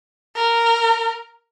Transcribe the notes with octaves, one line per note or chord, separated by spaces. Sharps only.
A#4